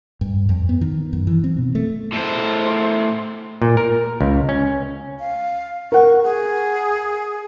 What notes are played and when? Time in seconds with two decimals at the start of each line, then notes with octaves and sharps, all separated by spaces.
0.21 G2
0.49 F2
0.69 B3
0.81 D#3
1.13 F#2
1.27 E3
1.44 C4
1.57 B2
1.75 A3
2.12 A2 C5
3.62 A#2
3.77 A#4
4.21 C#2
4.49 C#4
5.19 F5
5.92 A#4 F#5 C#6
6.23 G#4